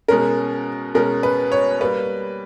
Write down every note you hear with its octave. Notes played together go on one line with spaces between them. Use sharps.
B2 G#3 C#4 A#4
B2 G#3 C#4 A#4
B4
C#5
G3 A#3 B4